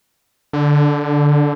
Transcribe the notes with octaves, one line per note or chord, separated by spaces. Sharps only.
D3